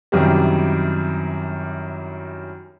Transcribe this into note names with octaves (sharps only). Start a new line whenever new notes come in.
F#2 C3 D#3 E3 G3